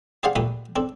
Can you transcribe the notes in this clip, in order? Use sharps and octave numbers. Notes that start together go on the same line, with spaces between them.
G4 G#4 C5 D5 F5 F#5
A#2 A3 G4 B4 B5 D#6
C4 D4 A4